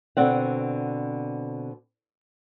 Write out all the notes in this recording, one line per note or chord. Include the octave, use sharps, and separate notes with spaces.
B2 D3 C4 F#5